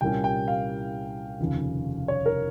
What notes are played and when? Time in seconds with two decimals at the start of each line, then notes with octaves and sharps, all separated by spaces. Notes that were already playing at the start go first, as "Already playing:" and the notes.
0.01 C2 A#2 G3 A#3 C#4 G5
0.24 G5
0.48 F5
1.39 F1 D#2 C#3 F3
2.08 C#5
2.26 A#4